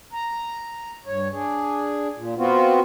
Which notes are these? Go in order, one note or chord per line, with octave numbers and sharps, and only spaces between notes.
A#5
G2 C#5
D4 G#4
A#2
B3 C4 F4 F#4